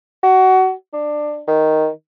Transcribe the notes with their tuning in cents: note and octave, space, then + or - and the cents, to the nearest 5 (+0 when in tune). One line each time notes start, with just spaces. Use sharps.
F#4 +25
D4 +20
D#3 +0